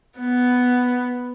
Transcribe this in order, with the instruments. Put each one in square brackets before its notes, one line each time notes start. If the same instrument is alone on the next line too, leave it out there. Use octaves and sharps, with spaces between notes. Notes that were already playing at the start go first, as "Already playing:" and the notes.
[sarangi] B3